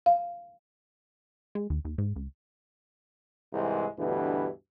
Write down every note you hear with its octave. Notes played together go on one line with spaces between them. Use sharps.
F5
G#3
D#2
D#2
G#2
C#2
C2 G#2 E3 G#3
D2 G2 B2 E3